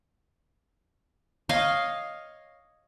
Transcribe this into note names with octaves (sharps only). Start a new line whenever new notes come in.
C#5 D#5 F5